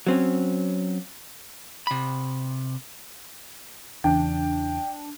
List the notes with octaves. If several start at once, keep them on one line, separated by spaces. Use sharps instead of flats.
F#3 C4 C#4
C3 B5
E2 C#3 E3 D4 G5